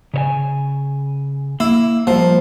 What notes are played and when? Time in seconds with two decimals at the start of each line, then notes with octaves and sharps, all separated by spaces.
0.14 C#3 C#5 G#5
1.60 A#3 E4
2.07 F3 G3 A#3